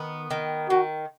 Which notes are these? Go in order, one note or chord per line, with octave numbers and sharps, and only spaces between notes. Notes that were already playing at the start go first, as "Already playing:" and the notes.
Already playing: D#3 B3
D#3
D#3 F#4